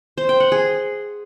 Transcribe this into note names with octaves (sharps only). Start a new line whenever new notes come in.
C5
G5
F#5
G#4